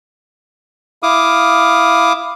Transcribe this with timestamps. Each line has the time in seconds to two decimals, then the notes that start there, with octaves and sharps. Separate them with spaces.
1.03 E4 F5 D6 D#6